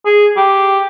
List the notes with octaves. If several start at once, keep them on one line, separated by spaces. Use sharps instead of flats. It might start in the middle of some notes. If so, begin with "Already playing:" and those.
G#4
G4